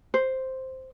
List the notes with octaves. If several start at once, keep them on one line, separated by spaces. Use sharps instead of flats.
C5